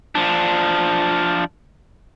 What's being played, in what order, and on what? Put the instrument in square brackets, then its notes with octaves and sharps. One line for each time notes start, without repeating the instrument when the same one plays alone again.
[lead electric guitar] F3 D4